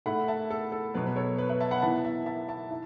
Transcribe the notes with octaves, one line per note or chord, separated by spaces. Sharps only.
A2 A3 E4 F#5 B5
E5 A5
A4
A4
B2 F#3 B3 B4
B4
A4 C#5
B4
B4 E5
E5 A5
F#5 B5
E3 B3 E4 E5 A5
E5 A5
E5 A5
E5 A5
E4